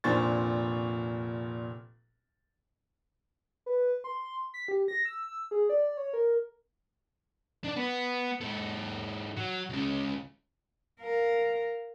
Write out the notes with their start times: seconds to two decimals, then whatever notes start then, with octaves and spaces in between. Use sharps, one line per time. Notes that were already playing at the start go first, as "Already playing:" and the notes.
0.04 F1 A#2 D4 C5 C#6 A6
3.66 B4
4.04 C6
4.54 B6
4.68 G4
4.88 A#6
5.05 E6
5.51 G#4
5.69 D5
5.97 C#5
6.13 A#4
7.64 D4 D5
7.76 B3
8.41 G#2 A4
9.36 F#3
9.69 C#2 C#3
11.00 A#4 F5